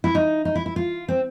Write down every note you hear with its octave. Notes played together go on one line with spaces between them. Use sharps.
E4
D#4
D#4
E4
E4
F4
C4